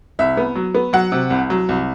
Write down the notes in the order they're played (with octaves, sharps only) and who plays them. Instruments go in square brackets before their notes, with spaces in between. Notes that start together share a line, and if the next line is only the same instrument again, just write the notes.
[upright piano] C2 E5
B3
F#3
B3
F#3 F#5
C3
C2
F#3
C2